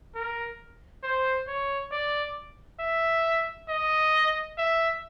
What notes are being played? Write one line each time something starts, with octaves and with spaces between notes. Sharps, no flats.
A#4
C5
C#5
D5
E5
D#5
E5